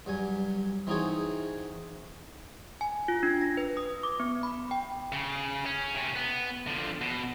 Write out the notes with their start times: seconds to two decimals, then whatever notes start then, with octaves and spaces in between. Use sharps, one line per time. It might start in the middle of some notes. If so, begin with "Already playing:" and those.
0.06 G2 F#3 G#5
0.87 E3 C4 D#4 F#4 G#4 C#5
2.81 G#5
3.08 F4
3.23 D4
3.41 A#6
3.57 B4
3.77 D#6
4.03 D6
4.20 B3
4.43 B5
4.71 G5
5.12 C#3
5.66 C#4
5.95 C3 C#4
6.16 B3
6.67 D3 F3
7.01 B2